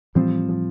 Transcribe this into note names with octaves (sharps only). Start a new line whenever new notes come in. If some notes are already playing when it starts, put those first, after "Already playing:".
A2 E3 F3 G3 C4
F3